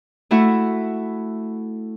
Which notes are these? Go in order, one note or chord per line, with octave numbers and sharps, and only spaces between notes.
A3 E4 F#4